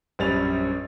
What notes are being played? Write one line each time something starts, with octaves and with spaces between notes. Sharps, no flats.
A#1 F#2 G3 C#4 A6 F7